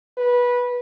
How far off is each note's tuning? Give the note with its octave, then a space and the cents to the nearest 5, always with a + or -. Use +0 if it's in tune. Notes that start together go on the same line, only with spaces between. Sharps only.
B4 -15